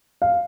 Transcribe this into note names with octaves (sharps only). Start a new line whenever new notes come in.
F5